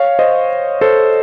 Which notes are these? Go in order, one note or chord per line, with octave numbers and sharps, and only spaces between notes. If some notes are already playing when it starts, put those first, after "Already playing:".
Already playing: C#5 F5
C5 D#5
A4 C5